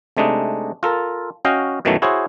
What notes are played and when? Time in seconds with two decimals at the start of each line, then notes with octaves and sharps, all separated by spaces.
0.17 C3 G#3 A3 D4 D#4
0.83 F4 A4 A#4
1.45 C#4 F#4 D#5 F5 G5
1.85 F#2 B2 D#3 E3 F#3 A3
2.02 E4 F#4 G#4 C5 C#5